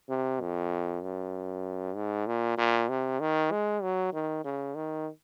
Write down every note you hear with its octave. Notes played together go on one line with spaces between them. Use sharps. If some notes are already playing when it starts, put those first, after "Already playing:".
C3
F2
F#2
G#2
A#2
A#2
C3
D#3
G#3
F#3
D#3
C#3
D#3